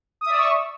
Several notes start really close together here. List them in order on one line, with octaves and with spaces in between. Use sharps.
D#6 E5 D5 E6 C#6